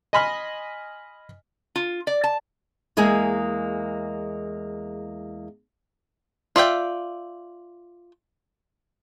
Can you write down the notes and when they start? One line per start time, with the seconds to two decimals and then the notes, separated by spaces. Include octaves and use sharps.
0.13 D#5 G#5 B5 C6 F6
1.76 F4
2.07 D5
2.24 A5
2.97 E2 G#3 A#3 G#4 G#5
6.56 F4 D5 E5 G5